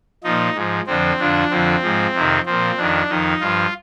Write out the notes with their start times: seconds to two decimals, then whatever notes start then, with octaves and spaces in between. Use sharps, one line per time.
0.23 A#2 F3 D#4
0.55 G#2 F3
0.87 F2 D3 F3 C4
1.19 F2 D3 F3 D4
1.51 F2 D3 F3 C4
1.82 G#2 F3
2.14 F2 C3 D#3
2.46 A#2 F3 C4
2.77 F2 D#3 D4
3.09 F2 D#3 D#4
3.40 G2 F3 F4